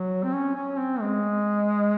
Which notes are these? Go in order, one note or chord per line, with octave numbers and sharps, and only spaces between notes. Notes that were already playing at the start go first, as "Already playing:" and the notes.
Already playing: F#3
C4
C#4
C#4
C4
G#3